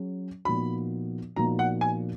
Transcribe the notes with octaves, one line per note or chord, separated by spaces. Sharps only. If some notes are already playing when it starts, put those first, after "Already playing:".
Already playing: F#3 C#4 G#4
A#2 F3 B3 D#4 F#4 B5
A#2 F3 B3 D#4 F#4 A#5
F#5
G#5